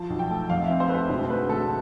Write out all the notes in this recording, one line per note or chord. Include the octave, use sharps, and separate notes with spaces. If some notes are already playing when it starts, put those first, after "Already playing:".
Already playing: F3 A5
B1
G5
A3
F2 F5
E5
C4
C5
A3 B4
C5
E1 C5
D2 B4
D2 A4